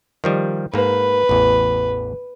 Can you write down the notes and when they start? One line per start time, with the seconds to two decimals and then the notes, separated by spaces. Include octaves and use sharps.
0.24 D#3 F3 G3
0.74 G#2 A#3 B4
1.29 A1 E2